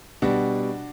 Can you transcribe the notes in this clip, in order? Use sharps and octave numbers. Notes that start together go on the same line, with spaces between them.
B2 G3 D4 F#4